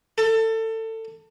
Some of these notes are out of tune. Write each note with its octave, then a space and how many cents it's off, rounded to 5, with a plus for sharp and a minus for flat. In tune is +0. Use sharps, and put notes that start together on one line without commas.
A4 +25